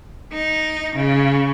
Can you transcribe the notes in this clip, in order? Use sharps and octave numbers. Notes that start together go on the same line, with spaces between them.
D#4
C#3